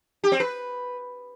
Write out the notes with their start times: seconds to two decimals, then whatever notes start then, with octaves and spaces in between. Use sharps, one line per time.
0.24 G4
0.32 C4
0.40 B4